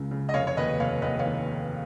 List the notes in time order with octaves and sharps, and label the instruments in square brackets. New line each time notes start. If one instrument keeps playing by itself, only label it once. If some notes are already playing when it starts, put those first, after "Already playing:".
Already playing: [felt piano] C#2 C#3
C#3
D#5
F1 C#5 F5
C#5
D#2 B4 D#5
F1 C#5 F5
D#2 B4 D#5
C#5 F5
D#3